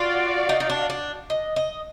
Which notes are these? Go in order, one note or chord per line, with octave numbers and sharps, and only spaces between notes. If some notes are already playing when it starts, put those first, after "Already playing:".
Already playing: F4 F#4 D5 F5
D#4
D#4
D4
D4
D#5
D#5